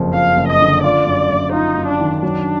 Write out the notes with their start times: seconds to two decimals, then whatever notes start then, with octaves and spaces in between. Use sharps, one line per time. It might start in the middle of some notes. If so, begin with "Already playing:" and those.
Already playing: F#1 F2 F3
0.14 F3 F5
0.37 F#1
0.49 D#5
0.61 D3
0.84 F4 D5
1.06 F#2
1.30 F#2
1.53 D#4 F4
1.77 F#2
1.88 D4
2.00 D#3
2.23 F#3 D4